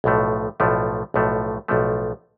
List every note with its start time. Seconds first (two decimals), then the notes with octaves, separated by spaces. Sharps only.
0.04 B1 A2 F3 A3
0.60 B1 A2 F3 A3
1.14 B1 A2 F3 A3
1.68 B1 A2 F3 A3